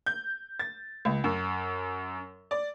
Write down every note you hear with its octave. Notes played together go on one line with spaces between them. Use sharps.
G6
A6
C#2
F#2
D5